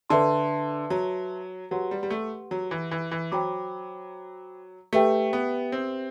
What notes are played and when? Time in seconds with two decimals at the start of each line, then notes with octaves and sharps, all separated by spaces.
0.10 D3 B4 E5 A5 C6
0.90 F#3
1.71 F#3 G4 B4 F#5 C6
1.91 G3
2.03 G3
2.10 A3
2.51 F#3
2.71 E3
2.91 E3
3.12 E3
3.32 F#3 C5 G5 B5 D6
4.93 A3 G4 B4 E5 G5
5.33 B3
5.72 C4